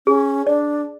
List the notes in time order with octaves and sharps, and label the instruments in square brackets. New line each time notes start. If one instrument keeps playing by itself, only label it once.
[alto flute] C#4 [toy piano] G#4
[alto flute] D4 [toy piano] D5